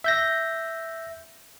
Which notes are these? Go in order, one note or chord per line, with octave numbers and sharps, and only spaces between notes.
E5 G6 A#6